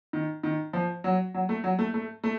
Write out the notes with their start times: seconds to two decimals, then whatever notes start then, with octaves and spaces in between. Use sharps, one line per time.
0.13 D#3
0.43 D#3
0.73 F3
1.04 F#3
1.34 F#3
1.49 A3
1.64 F#3
1.79 A3
1.94 A3
2.24 A3